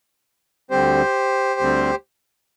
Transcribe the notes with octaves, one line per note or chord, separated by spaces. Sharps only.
D2 D3 G3 C4 G4 C5
D2 D3 G3 C4